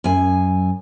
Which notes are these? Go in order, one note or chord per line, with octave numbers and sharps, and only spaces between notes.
F#2 G#5